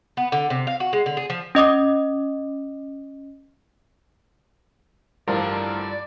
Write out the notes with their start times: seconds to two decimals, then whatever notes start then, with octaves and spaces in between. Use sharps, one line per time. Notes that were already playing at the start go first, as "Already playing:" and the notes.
0.17 B3
0.32 D3
0.50 C3
0.67 F5
0.80 F#4
0.93 G#3
1.06 D3
1.17 G#4
1.30 F3
1.55 C#4 D#5 D6 D#6
5.28 A1 G2 D3 F3 F4 A#4 C5 D5